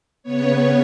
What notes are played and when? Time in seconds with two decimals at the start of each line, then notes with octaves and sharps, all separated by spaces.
0.23 C#3 B3 C#5